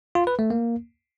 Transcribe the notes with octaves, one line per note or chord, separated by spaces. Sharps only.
F4
B4
A3
A#3